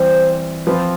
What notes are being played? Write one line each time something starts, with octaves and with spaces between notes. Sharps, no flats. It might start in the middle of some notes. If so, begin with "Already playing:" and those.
Already playing: E3 G3 C4 C5
F3 C4 F4 B4